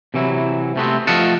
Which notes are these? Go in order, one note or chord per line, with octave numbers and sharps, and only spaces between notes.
C3 E3 F#3 E4
C3 A3 B3 C4
F3 A3 D#5 F5 F#5 A5